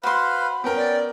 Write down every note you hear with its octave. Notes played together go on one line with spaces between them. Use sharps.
F#4 B4 C5 F5 B5 C6
B3 C#4 A#4 G5
D5